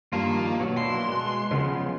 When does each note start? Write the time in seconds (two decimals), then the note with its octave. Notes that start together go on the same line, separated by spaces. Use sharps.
0.13 G2 D#3 F3 A#3 F4
0.60 B2 F#3
0.77 A#3 D4 E4 C6
1.09 G#3 F#6
1.51 C#3 F3 F#3 B3